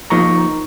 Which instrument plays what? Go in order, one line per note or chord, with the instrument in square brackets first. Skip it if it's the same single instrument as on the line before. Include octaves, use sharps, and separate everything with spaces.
[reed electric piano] F3 A#3 D#4 A#5 C#6